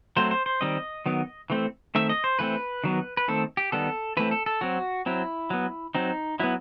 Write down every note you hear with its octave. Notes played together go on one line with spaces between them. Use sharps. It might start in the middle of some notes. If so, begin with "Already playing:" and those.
F#3 A3 C4 C5
C5
C5
D#3 G3 C4 D#5
D#3 F#3 B3
E3 A3 C4
D#3 A3 C4 E5
D#5
C5
E3 A3 C4 B4
D#3 F#3 B3
B4
D#3 A3 C4 A4
G4
D#3 G3 B3 A4
E3 A3 C4 B4
A4
A4
F#3 C4 F#4
F#3 C4 E4
F#3 B3
F#3 C4 D#4
F#3 B3 E4